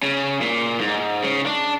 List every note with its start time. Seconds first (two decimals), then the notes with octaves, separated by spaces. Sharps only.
0.03 C#3
0.41 A#2
0.80 G#2
1.23 C#3
1.46 D4